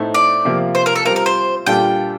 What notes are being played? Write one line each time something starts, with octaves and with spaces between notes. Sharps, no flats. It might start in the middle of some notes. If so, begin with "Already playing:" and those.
Already playing: A2 A3 C4 D#4
D5
C3 F3 A#3 F4
C5
A#4
A4
G3 C4 F4 A#4
A#4
C5
A#2 G3 D4 F4 A4 G5